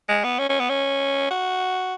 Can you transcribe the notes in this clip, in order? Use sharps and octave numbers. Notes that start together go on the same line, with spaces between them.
G#3
B3
C#4
C#4
B3
C#4
F#4